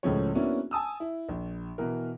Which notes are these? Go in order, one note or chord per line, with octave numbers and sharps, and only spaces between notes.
C#2 A2 C#3 F3 C#5
A#3 B3 C#4 D4 E4 F#4
G#5 A5 D#6 E6
E4
A#1
B2 E3 A#4